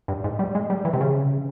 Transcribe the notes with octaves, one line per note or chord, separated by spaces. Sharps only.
G2
G#2
G3
G#3
G3
E3
C3
C#3